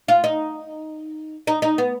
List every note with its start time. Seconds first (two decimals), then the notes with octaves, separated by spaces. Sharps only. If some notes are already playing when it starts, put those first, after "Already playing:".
0.08 F4
0.24 D#4
1.47 D#4
1.62 D#4
1.78 B3